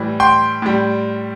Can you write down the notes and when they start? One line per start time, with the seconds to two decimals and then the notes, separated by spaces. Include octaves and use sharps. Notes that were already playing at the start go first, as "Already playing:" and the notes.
Already playing: A2 E3 G3
0.20 G5 C6
0.62 A2 G3